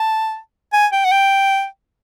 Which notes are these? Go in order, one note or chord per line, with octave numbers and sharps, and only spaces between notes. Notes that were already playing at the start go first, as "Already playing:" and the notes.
Already playing: A5
G#5
G5
F#5
G5